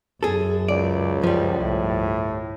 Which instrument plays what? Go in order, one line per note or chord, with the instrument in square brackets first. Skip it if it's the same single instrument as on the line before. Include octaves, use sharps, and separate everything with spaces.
[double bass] F#2 [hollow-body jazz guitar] G#4 A4
[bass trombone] C#2 [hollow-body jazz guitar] D5
[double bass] F#2 [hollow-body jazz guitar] F3 G3
[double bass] G1 C2 [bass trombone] A2